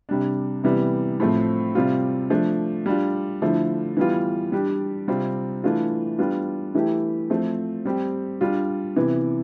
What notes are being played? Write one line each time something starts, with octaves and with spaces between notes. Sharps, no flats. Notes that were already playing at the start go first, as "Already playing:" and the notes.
C3 G3 D4
C3 E3 G3 B3 E4
A2 F3 A3 C4
C3 G3 C4 F4
F3 A3 D4
G3 D4 F4
D3 F3 A3 E4
E3 G3 B3 F4
G3 D4 G4
C3 G3 C4 F4
E3 A3 D4 F4
G3 B3 D4 F4
E3 A3 E4 G4
F3 A3 C4
G3 C4 G4
G3 D4 F4
C3 E3 B3